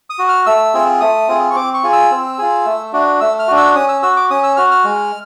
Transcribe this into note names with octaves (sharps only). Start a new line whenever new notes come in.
D#6
F#4
F6
A3 E6
C4 F4 G#4
A3 D#6
C4 F4 G#4
C#6
C4 D6
C#6
F4 G#4
E6
C4
F4 G#4
A3
D4 F#4
A3 E6
F6
D4 F#4
E6
C#4 D#6
E6
F#4 E6
D6
C#4 D#6
E6
F#4 F6
F6
G#3